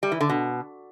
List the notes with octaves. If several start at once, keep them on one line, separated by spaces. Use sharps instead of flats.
G3
E3
D3
B2